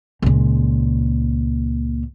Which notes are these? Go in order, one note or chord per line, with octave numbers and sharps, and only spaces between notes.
C#2 A#2